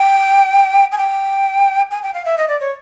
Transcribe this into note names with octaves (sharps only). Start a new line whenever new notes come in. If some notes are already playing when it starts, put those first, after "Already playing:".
Already playing: G5
G#5
G5
G#5
G5
F5
E5
D#5
D5
C#5